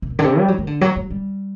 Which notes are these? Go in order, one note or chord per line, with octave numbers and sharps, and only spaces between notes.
C3
A#2
D3
C3
G3
F#3
D#3
D3
F#3
F#3
G3